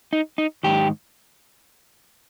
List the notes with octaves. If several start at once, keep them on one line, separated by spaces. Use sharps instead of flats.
D#4
D#4
G#2 D#3 G4